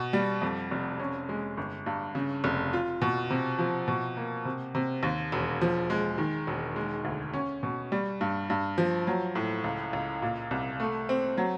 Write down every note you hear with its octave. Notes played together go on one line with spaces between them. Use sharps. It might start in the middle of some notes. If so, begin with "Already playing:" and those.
Already playing: B2
G3
F2
F1
C#4
G#3
G1
G2
C#3
F1
F4
B2
C3
F3
B2
A#3
C3
C3
D#2
E1
F3
G#3
D#3
E1
G#3
D2
C#4
B2
G3
G2
G2
F3
F#3
A2
C#2
C#2
A#2
C2
A3
C4
F#3